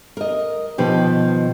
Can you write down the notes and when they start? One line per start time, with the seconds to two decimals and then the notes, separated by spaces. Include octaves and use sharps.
0.17 A#4 D#5
0.78 B2 D#3 F3 G4